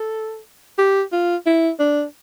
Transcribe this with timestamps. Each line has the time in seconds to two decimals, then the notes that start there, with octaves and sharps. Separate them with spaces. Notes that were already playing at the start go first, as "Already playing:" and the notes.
Already playing: A4
0.78 G4
1.12 F4
1.46 E4
1.79 D4